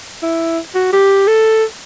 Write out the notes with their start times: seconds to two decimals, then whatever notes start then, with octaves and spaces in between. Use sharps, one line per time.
0.22 E4
0.75 F#4
0.93 G4
1.27 A4